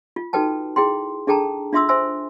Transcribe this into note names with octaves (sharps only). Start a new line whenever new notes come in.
F4
D#4 F#4 A4 B4 G5 A5
E4 G#4 G5 C6
D4 G#4 A4 G5 A5 A#5
D4 F4 E5 C6 D#6 E6
C5 E5 G#5 C6 E6